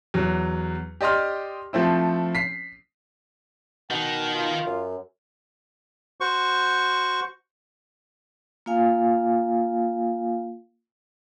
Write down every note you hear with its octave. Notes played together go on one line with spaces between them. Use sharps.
E2 F#3
G4 D5 D#5 C6 F6
F3 A3 C4 E4
B6 C7
B2 D#3 F#5
F4
F#2
F#4 C5 C#6
A#3 F4 F5 G#5